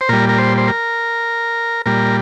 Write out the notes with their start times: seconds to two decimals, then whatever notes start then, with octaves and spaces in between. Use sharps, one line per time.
0.01 C5
0.09 A#2 G3 A#4
0.29 A#4
0.38 C5
0.58 C5
0.68 A#4
1.86 A#2 G3 A#4